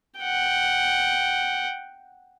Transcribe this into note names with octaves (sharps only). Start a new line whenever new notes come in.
F#5 G5